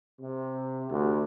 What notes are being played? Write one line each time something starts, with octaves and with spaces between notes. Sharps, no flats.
C3
D2